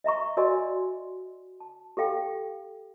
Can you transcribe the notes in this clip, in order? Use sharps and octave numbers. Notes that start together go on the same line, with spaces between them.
D#5 E5 A#5 C#6
F#4 A#4 D5 D#5 G#5 C6
A5
G4 A4 F5 G5